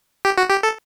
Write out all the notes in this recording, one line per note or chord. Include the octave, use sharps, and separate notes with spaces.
G4
F#4
G4
A4